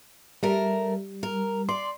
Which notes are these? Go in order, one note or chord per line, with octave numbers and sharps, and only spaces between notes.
G3 A3 A#4
A#4
D5 C6